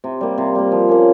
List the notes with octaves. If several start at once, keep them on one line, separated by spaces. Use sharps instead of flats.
C3
G3 A#3
C3
G3 A#3
F3
A#3 C#4